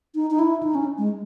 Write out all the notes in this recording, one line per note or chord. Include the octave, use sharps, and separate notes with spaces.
D#4
D#4
E4
D#4
C#4
G#3